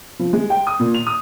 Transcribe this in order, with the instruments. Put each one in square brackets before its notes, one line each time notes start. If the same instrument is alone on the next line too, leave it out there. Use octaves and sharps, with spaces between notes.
[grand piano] F3
G#3
G5
D#6
A#2
F7
D#6